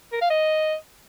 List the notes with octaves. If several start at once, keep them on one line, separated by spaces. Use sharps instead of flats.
A#4
F5
D#5